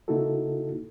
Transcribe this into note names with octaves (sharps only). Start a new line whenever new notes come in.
C#3 A#3 D#4 E4 F#4 A4